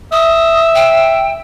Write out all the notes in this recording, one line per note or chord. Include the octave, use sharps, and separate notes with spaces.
E5 D#6
G5